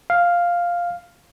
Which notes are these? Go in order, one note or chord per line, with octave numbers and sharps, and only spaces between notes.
F5